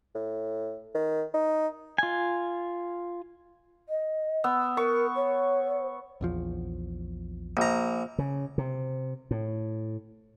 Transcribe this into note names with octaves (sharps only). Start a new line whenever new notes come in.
A2
D#3
D#4
F4 G#5
D#5
B3 E6
A#4 C#6
C#5
A#1 E2 F3
A#1 A#5
C#3
C3
A2